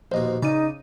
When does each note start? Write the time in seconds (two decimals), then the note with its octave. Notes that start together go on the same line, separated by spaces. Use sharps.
0.12 A#1 D#2 B2 C5 D#5
0.42 C#3 D#4 D5 D#7